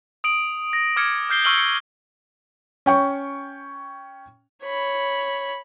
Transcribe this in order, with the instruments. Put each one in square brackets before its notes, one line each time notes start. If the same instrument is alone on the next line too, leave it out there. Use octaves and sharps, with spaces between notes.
[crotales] D#6 D7 F#7
A#6
D6 F6 G#6 A#6 C#7
F6 G6 C7 G7
C#6 E6 F6 F#7 G7
C#7
[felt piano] C#4 G5 C#6
[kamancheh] C#5 B5